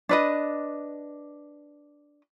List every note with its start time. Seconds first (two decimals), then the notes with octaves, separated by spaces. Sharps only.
0.09 D4 B4 D#5